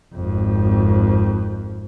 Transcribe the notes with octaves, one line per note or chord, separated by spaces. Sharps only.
G#1 F2